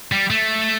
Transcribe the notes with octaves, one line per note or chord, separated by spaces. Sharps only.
G3
A3